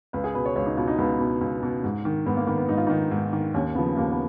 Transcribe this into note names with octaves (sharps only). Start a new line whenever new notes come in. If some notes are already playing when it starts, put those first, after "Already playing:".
C#2 B4
G#4
B2 B4
C#5
C#2 C#5
D#4
B2 F4
D#4
C#2 B3
B2
C#2
B2
G#2
D#3
G#2 B3
A#3
D#3 B3
B3
G#2 D#4
F4
D#3 D#4
G#2
D#3
D#2 C#4
C#3 F3 B3
D#2 A#3
B3